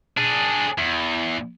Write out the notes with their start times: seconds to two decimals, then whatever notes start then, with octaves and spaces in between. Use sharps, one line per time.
0.17 D4 G#4
0.78 E2